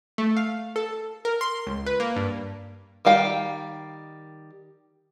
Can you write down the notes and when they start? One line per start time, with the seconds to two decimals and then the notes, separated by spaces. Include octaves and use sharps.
0.18 A3
0.37 F5
0.76 A4
1.25 A#4
1.41 C6
1.67 C#2
1.86 B4
2.00 A#3
2.16 G2
3.05 D#3 G3 F5 G5